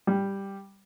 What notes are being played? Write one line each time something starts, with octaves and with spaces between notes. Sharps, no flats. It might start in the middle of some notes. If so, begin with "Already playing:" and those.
G3